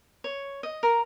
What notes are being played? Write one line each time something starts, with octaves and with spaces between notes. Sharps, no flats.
C#5
D#5
A#4